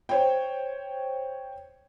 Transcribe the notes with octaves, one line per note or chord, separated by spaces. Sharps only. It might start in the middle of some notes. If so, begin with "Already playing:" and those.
C5 C#5 G5